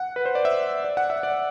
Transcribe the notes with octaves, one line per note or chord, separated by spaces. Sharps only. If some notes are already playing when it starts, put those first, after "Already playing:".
Already playing: F#5
B4
C5
D5
E5
D5
F#5
E5
D5